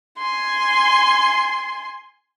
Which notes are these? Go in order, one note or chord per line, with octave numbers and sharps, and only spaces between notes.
G#5 C6